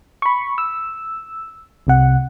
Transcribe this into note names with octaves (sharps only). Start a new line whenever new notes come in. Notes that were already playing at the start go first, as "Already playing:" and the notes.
B5 C#6
E6
C2 C3 F#5